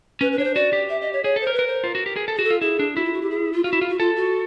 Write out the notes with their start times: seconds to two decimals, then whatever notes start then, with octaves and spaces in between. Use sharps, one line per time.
0.21 C#4 B4
0.32 B4
0.38 D4 C#5
0.44 C5
0.55 F#4 D5
0.73 G4
0.89 E5
1.01 D#5
1.13 C#5
1.24 G#4 C#5
1.36 A4
1.41 C5
1.47 A#4
1.54 B4
1.59 A#4
1.67 C5
1.84 F4
1.95 F#4
2.06 G4
2.16 G#4
2.28 A4
2.36 F#4 G#4
2.44 A4
2.50 F4
2.61 E4 G#4
2.79 D4
2.96 E4 F#4
3.05 F4
3.13 F#4
3.22 G4
3.30 G#4
3.53 F4
3.64 F4 F#4
3.73 E4
3.81 F4
3.89 F#4
3.99 F4 A4
4.16 F#4